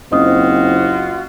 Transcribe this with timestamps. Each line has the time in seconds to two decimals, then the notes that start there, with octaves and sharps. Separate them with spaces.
0.11 F#1 C4 F4 F#4 C5 D#5 D#6